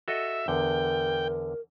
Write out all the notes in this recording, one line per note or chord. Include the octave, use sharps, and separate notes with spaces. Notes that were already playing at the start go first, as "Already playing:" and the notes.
F#4 A4 D#5 E5
E2 D3 A#4 G5